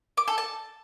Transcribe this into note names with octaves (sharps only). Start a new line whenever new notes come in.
D6
A4
A5